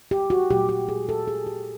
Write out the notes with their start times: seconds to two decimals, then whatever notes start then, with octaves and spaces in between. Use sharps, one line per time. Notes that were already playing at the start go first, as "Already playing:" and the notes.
0.11 G4
0.30 F#4
0.50 A#2 F#3 A3 G4
0.69 G4
0.89 G#4
1.09 A4
1.28 G#4
1.46 G4